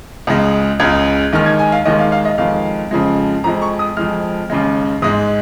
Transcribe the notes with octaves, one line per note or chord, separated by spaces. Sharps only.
C#2 C#3 G#3
C#2 C#3 G#3 G#6
D#2 D#3 G#3 F6
G#6
G#5
F5
D#2 D#3 G#3 D#5
F5
F5
D#5
F2 D#3 G#3 F5
F2 C#3 F3 G#3
F2 F3 G#3 A#5
C#6
D#6
F2 F3 G#3 F6
D#2 C#3 G#3
G#2 G#3 D#6